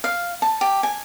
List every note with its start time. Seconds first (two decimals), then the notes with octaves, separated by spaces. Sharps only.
0.04 F5
0.42 A5
0.61 G4
0.83 G#5